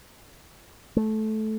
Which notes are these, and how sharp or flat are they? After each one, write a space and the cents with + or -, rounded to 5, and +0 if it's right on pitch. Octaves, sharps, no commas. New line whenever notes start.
A3 -15